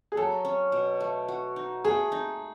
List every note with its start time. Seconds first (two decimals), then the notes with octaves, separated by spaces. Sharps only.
0.12 G#4
0.17 F#3 A4
0.45 C#4
0.72 B2
1.00 A3
1.28 F#4
1.56 D#4
1.85 A3 G#4
2.12 D#4